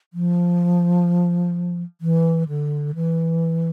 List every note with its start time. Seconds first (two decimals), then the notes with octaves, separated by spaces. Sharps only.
0.13 F3
2.01 E3
2.49 D3
2.95 E3